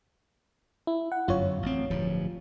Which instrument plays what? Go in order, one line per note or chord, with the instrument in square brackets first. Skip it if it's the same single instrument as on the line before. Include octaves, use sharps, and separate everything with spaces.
[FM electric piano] E4
F#5
[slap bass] G1 F#2 [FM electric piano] F4 C#5
[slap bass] A1 C4
D1 G2 F3